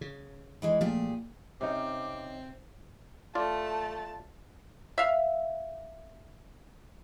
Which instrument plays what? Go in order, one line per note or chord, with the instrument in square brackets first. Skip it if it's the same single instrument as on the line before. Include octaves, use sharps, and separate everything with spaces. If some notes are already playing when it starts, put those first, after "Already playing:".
[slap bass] C#3
[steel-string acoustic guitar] E3 G#3 D#4
[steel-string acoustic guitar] A#2 G4 G#4 [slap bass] F3 A3
[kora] C3 [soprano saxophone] C4 [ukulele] C#4 D#4 F5 [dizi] D6
[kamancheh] A3 [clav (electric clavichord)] F4 D5 [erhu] A5
[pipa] E5 F5